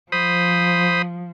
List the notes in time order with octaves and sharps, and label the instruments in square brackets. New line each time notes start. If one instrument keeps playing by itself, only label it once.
[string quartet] F3 [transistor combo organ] C5 B5 D#6